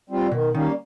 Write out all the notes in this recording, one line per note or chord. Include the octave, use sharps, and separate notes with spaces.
G3 C4 F4
B2 D#3
D#3 G3 A#3 C#4